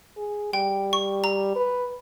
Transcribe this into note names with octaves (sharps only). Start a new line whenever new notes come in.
G#4
G3 G5
C#6
A#5
B4